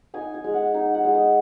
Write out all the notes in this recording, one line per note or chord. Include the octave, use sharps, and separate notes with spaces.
D#4 G#5
G#5
G#3
F#5
D#4 G#5
F#5
G#3
D#5